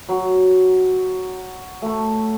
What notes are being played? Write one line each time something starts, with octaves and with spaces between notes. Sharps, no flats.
F#3
A3 C#6